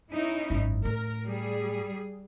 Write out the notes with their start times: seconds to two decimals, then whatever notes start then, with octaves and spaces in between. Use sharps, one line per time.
0.12 C#4 D#4 E4
0.50 G#1 F#2
0.85 A2 A#4
1.26 G3 G#4